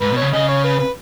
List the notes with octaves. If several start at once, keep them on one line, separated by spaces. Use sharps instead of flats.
G#2 B4
B2
C#3 C#5
C#3 D#5
C#5
B4
B4